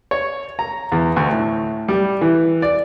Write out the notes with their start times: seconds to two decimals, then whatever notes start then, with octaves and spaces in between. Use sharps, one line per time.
0.11 C#5
0.59 A#5
0.92 E2
1.16 D2
1.32 A2
1.88 G3
2.21 E3
2.62 D5